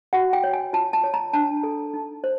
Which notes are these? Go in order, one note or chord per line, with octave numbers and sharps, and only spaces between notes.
F#4 F#5
G5
C#5
G#5
F4 A5
A5
C#5
A#5
D4 A5
A4
D#4
C5